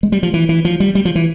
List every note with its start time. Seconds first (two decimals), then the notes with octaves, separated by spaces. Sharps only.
0.03 G#3
0.12 G3
0.23 F3
0.34 E3
0.49 E3
0.65 F3
0.80 G3
0.95 G3
1.05 F3
1.15 E3